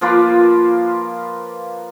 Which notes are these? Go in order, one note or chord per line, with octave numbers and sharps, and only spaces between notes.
F3 A#3 F4 B4